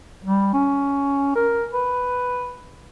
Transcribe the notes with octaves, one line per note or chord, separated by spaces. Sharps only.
G3
C#4
A#4
B4